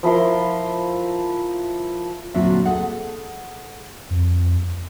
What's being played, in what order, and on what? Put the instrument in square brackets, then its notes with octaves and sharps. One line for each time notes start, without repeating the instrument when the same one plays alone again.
[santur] F3 E4 A#4 C6
[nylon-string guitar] D2 A#2 F#3 C4 D4 E5
G#4 A4 F#5
[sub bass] F2